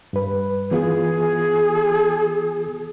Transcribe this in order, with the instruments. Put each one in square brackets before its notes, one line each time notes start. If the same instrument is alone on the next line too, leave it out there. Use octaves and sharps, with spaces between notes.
[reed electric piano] G2 B4
[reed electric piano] E3 B3 F4 [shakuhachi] G#4